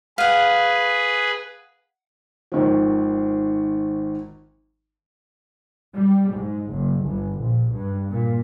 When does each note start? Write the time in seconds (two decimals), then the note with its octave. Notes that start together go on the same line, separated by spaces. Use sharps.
0.18 G#4 B4 F5 F#5
2.52 G#1 D#3 F3
5.95 G3
6.30 G#2
6.70 F#1
7.04 G1
7.40 A#1
7.72 G2
8.10 A#2